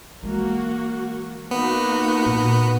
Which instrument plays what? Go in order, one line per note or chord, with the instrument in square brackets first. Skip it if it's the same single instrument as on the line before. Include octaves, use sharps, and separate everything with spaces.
[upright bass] E3 G#3 [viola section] A#3 F#4
[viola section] A#3 D#4 F#4 [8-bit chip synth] B3
[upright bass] A#2